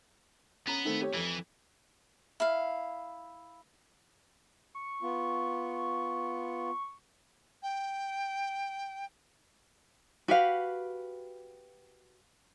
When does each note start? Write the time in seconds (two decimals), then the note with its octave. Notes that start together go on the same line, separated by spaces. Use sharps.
0.67 B3 C#4 A#5
0.85 D#3 A3 C4
1.01 G4 C#5
1.14 F2 E3
2.40 E4 F5
4.75 C#6
5.02 B3 F4
7.62 G5
10.28 F#4 G4 B4 F5